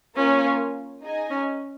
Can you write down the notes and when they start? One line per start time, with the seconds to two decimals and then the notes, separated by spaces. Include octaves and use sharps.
0.17 A#3 C#4 F4 A#4 C#5 G#5
1.02 D#4 G#4 D#5 G#5
1.30 C#4